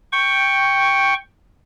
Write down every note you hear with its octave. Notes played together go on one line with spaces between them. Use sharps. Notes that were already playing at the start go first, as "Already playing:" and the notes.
G5 C#6